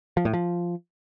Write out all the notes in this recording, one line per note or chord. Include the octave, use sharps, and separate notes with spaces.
F3
A2
F3